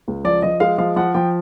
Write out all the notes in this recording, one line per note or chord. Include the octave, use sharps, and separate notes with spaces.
C#2
F3 D5
F3 D#5
G#3 F5
F3 F5
F3 F#5
F3 G5